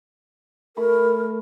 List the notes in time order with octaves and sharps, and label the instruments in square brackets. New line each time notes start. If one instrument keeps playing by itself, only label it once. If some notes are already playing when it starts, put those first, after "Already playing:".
[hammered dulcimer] A3 B5 [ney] A#4